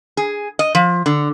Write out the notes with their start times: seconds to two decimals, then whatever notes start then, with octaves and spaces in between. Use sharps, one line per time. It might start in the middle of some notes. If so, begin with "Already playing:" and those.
0.17 G#4
0.59 D#5
0.75 F3
1.06 D3